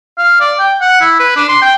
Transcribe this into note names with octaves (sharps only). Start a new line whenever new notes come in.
F5
D5
G5
F#5
E4
B4
D4
C6
G5